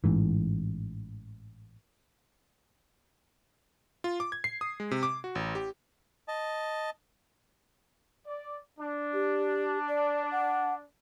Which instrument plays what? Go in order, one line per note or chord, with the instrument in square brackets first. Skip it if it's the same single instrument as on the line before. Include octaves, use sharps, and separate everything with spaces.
[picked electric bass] A1 G#2 E3
[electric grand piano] F4
D6
G#6
C7
D#6
G#3
C3
D6
F#4
A1
G4
[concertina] D#5 A5
[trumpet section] D5
D4
[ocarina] G4
D5
F#5